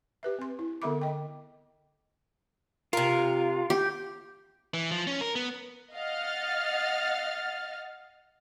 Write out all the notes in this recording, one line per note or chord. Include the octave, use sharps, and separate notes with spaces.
G4 B4 E5
C4 C6
E4
D3 B3 A4 E5 B5 D6
D#5 G5
C3 F4 A#4
G4
E3
F3
C#4
A#4
B3
D#5 F5 F#5 F6 A6